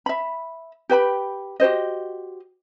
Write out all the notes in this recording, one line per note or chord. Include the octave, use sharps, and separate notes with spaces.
E5 B5
G4 B4 G5 B5
F#4 G4 C5 D#5